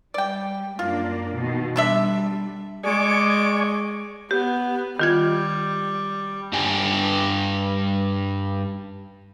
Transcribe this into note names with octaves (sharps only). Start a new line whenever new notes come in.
G3 D5 G5
F#2 A#3 D4 F4
B2 D#3
D3 G3 D4 E5
G#3 D5 G#5 C#6 D6
B3 G4
D#3 G3 F4 G#6
G2 D4 G4 G#5